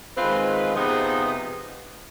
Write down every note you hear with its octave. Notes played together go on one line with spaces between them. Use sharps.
D#3 G#3 C4 F4 B4
C3 F3 B3 D#4 G#4